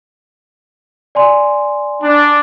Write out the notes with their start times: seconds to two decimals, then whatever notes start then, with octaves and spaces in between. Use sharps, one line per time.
1.15 D5 G#5 C6
2.03 D4